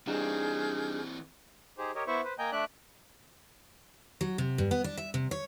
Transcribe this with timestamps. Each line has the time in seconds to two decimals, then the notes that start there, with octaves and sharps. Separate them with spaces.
0.07 E3 G3 C4 D4 D#4 G#4 F6 G6
1.78 D#4 G4 G#4 C5
1.95 G4 A#4 C#5 D#5
2.07 B3 E4 C5 E5 C#6
2.24 B4 C5
2.39 A#3 D#5 G5 G#5 A#5 G6
2.52 A3 D4 D5 E5 F#6
4.21 F#3
4.38 C3
4.58 G2
4.71 B3
4.84 D4
4.97 E5
5.14 C3
5.31 C#5